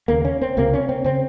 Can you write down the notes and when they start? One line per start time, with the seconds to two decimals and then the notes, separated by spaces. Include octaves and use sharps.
0.08 D#2 C#3 A#3
0.25 C#4
0.41 C4
0.57 C#2 C3 A#3
0.74 C#4
0.89 C4
1.04 C#3 C4